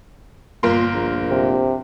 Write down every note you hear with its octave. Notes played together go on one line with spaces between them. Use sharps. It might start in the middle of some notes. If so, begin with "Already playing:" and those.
G1 A#2 A#4 C6
A#1
C3